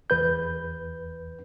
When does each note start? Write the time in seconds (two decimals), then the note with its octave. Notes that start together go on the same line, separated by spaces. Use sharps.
0.10 E2 B4 G6